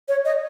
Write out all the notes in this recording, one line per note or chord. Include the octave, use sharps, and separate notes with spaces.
C#5
D#5